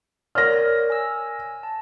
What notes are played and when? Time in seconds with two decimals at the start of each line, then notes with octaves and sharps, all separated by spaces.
0.35 A#4 C#5 D5 F6 A#6
0.90 G#5 E6
1.63 A5